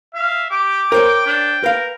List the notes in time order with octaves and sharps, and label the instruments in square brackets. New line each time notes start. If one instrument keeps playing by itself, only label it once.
[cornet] E5 [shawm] F5
[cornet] G4 [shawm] D6
[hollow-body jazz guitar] A#4 C5 C#5 [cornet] G5
[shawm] D4
[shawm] A#4 [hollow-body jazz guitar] B4 F5